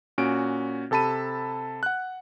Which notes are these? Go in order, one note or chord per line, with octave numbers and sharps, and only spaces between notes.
A#2 C#4 F#4 D7
C3 A4 A5 B5 D#7
F#5 F#6